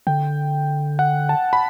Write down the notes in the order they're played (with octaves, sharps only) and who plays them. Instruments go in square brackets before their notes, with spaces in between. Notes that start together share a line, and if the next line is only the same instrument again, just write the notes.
[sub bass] D3 [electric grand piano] G5
[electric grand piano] F#5
A5
B5